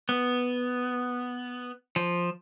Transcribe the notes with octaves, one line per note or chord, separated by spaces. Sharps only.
B3
F3